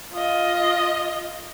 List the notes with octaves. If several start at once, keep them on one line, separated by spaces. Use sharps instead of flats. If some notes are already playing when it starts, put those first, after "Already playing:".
F4 D#5